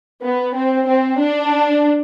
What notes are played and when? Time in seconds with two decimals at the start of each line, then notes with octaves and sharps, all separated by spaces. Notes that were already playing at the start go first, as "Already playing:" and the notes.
0.23 B3
0.55 C4
0.87 C4
1.19 D4